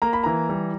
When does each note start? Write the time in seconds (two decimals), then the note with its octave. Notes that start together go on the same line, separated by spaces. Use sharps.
0.02 A#3 A#5
0.13 B5
0.24 E3 A#5
0.49 G3